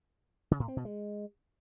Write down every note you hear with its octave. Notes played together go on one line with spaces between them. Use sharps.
C#3
A2
C4
B2
G#3